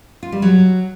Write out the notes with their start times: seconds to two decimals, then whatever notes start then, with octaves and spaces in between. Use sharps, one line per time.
0.23 F4
0.32 G3
0.42 F#3